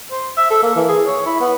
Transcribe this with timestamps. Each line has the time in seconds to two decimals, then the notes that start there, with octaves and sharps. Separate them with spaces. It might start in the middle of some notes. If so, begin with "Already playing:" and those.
0.11 C5
0.37 E5
0.50 A4
0.62 A#3
0.76 E3
0.88 G#4
1.06 C#5
1.25 E4
1.41 B3